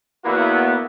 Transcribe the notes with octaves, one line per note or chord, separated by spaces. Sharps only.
E2 A#3 B3 E4 F#4